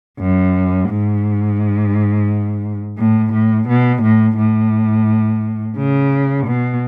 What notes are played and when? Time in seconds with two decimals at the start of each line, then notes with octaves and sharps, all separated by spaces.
0.19 F#2
0.89 G#2
2.99 A2
3.33 A2
3.68 B2
4.03 A2
4.38 A2
5.77 C#3
6.47 B2